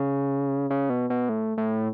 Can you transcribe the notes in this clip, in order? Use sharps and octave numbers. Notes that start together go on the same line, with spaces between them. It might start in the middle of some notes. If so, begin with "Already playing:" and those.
Already playing: C#3
C#3
B2
B2
A2
A2